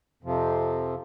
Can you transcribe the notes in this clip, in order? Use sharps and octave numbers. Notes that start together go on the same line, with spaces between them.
F2 C3 F3